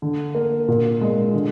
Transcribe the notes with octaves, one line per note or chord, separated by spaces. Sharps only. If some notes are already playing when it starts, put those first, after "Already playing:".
D3
A#3
A#2
G#3
D3